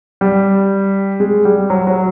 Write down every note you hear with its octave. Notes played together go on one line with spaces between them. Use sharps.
G3
G#3
G3
F#3
F#3